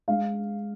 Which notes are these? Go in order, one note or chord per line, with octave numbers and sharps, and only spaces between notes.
G#3 F5